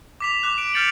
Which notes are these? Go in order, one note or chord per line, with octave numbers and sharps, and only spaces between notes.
D6 B6 F7
D6 F#6 F7
D7
F6 G6 A6 C#7 F#7